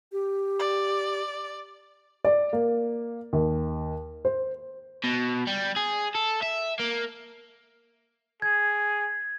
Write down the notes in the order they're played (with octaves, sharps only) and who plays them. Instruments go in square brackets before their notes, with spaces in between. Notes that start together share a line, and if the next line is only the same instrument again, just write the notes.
[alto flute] G4
[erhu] D5
[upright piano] D5
A#3
D#2
C5
[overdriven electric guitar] B2
G3
G#4
A4
E5
A#3
[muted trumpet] G#4 [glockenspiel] G#6